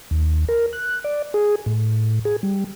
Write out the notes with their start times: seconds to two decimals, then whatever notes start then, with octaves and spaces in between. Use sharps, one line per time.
0.11 D#2
0.49 A#4
0.73 F#6
1.04 D5
1.34 G#4
1.66 A2
2.25 G#4
2.43 G3